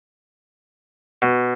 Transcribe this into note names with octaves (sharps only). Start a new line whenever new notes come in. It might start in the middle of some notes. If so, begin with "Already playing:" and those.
B2